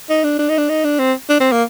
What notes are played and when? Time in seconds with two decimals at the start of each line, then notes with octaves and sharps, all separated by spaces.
0.09 D#4
0.24 D4
0.39 D4
0.49 D#4
0.58 D4
0.69 D#4
0.84 D4
0.99 C4
1.29 D4
1.40 C4
1.52 A#3